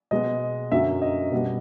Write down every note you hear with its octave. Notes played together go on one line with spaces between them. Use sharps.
B2 G#3 B3 D#5
F#2 D3 F#3 E5
D#5
B2 G3 B3